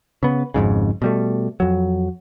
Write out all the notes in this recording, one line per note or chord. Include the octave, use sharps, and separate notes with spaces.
C#3 B3
G#1 F2 G#2 C#3
B2 G3 A3
F2 F#3